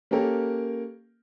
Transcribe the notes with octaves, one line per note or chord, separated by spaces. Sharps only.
A#3 C#4 G4 A4 A#4